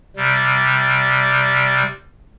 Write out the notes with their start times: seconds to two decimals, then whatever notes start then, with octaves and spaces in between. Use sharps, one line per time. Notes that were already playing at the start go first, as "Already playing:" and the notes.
0.16 C3 G3